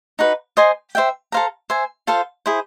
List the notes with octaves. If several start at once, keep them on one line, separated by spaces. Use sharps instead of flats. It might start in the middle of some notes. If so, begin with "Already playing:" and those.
D#4 F#4 B4
C5 D#5 G#5 C6
C5 E5 G5
A4 C5 F5 A#5
C5 E5 G#5
F4 A4 C5 F5
E4 G#4 C5